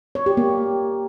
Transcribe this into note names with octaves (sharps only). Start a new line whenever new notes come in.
C#5
G4
A#3